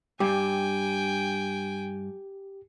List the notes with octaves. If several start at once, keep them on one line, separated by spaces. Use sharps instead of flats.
G2 G4 G5 G#5